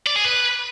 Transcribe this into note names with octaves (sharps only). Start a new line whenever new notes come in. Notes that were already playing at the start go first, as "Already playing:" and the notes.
D5
G#4
B4